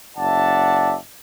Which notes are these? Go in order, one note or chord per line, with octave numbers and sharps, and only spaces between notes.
F#1 D5 E5 F#5 A5